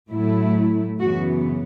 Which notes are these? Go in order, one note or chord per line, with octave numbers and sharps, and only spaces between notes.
A2 F#3 A3 E4
F#2 C#3 E3 B3 F#4